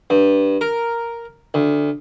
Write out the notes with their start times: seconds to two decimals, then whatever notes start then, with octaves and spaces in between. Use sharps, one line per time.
0.10 G2
0.61 A#4
1.54 D2